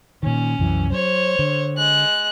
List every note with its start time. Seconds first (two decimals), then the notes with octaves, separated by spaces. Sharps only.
0.23 A#2 D#3 C#4
0.59 C2 F#2 E3
0.92 F#3 C5 C#5
1.39 D3
1.76 G#3 F#6